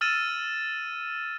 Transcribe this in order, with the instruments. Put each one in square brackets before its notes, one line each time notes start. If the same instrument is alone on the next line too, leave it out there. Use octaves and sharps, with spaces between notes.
[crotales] E6 F6 A6 D#7 E7